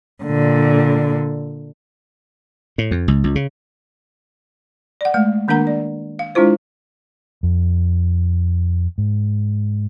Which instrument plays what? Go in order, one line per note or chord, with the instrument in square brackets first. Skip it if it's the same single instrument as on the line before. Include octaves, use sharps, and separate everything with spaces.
[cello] A#2 D3
[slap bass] A2
F2
C#2
C#2
C#3
[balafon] D5 F#5
G#3 A3 F5
D#3 A#3 D4 A#4 F#5 A#5
D5
F5
G#3 D4 E4 F4 C5
[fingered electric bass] F2
G#2